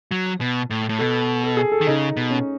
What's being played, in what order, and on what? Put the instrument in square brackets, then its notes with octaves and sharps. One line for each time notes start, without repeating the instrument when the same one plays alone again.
[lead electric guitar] F#3
B2
A2
A2
[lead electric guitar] B2 [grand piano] A4
[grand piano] A4
G#4
A4
[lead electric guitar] D#3
[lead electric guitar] C#3 [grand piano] D#4
[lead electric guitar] B2
[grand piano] C#4